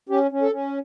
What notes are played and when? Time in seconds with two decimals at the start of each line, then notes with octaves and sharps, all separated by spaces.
0.09 C#4 G4
0.31 C#4
0.42 A4
0.52 C#4